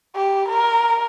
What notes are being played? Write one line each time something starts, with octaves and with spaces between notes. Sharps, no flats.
G4
A#4